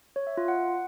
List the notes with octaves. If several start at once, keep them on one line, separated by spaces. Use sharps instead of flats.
C#5
E5
F4
F#5